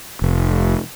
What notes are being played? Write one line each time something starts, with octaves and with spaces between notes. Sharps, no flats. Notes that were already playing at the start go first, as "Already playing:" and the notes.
F1